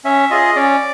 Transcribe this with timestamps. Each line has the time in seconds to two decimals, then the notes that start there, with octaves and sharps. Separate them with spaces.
0.05 C#4 E5
0.30 F4 G#4 D#5
0.56 C#4 D5